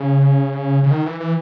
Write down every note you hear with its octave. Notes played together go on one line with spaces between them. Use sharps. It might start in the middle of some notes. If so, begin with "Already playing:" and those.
Already playing: C#3
C#3
D#3
E3
E3